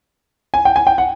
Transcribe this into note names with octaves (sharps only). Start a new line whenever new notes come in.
G#5
G5
G#5
G5
F#5